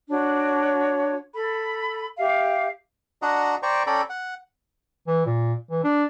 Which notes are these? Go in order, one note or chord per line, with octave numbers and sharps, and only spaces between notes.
D4 F#4 C#5
A4 B5
G4 E5 F5
D4 F#4 D#5 F#5 A#5
C5 D5 G5 A#5 C#6
C#4 A4 D5 G5 A#5 B5
F#5
E3
A#2
E3
D4